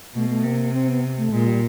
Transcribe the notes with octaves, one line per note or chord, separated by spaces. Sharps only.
B2 A3
A3
C3 A#3
C4
B3
A3
A#2 G#3
G3